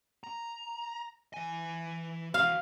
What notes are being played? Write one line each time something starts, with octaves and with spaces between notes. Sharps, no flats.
A#5
E3 G#5
E3 F#4 F5